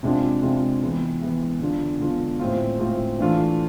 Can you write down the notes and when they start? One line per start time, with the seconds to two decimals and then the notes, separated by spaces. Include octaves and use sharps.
0.03 C3 G#3 D4 F4
0.43 C3 G#3 D4 F4
0.82 E3 G#3 B3
1.21 E3 G#3 B3
1.61 D3 G#3 B3 D4 F4
2.00 D3 G#3 B3 D4 F4
2.40 A2 G#3 C4 F4
2.79 A2 G#3 C4 F4
3.19 E3 A3 D4 F4